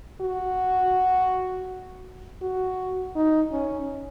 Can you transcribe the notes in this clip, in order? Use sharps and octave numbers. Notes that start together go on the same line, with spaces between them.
F#4
F#4
D#4
C#4